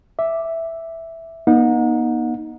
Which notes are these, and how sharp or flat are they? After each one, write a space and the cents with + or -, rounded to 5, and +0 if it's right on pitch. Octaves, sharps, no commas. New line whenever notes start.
E5 +0 D6 +0
B3 -45 D#4 +0 F#5 -40